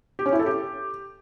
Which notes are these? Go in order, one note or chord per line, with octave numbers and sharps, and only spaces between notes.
G4
C#4
E4
A4
G4